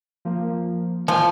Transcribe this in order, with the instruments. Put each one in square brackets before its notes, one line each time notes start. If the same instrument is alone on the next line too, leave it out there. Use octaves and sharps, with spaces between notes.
[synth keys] F3 A#3
[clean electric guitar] E3 F4 G#5 [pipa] F3